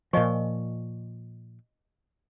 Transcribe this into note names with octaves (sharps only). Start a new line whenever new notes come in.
A#2 F3 D#5 G#5 C#6